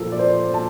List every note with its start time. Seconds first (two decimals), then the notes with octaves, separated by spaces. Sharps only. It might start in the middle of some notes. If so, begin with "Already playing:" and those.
Already playing: A#2 F3 A4 A#4
0.12 D5
0.19 C5
0.54 A5